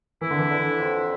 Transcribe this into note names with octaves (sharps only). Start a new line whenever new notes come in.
E3 E4
D3
E3
D3
F2